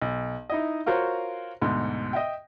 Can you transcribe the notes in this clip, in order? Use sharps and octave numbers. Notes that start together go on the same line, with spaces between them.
B1
D#4 E4 D#5
F4 F#4 A#4 C5 C#5
D2 G#2 B2
D#5 E5 G5